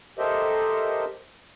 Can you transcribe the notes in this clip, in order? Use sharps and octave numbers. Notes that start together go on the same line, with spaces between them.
G4 A4 A#4 C5 D#5 E5